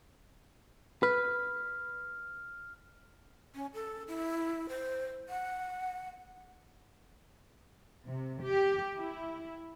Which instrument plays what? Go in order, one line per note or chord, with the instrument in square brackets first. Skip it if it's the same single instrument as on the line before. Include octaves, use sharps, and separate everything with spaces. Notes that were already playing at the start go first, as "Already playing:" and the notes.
[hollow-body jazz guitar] B4 [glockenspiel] F6
[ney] C#4
A4
E4
C5
F#5
[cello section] C3
G4
E4